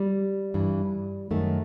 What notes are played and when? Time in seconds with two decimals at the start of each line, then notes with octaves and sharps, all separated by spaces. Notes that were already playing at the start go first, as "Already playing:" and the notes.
Already playing: G3
0.54 G2 E3
1.31 F#2 D#3 A3